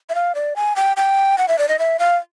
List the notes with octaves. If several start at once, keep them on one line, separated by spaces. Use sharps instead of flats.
E5
F5
D5
G#5
G5
G5
F#5
E5
D5
D#5
E5
F5